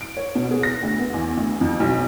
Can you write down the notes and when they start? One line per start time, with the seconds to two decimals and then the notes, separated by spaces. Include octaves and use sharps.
0.01 D7
0.17 C#5
0.35 B2
0.51 G#4
0.63 A#6
0.83 D2
0.99 B3
1.14 E2
1.37 D2
1.61 F2
1.80 B1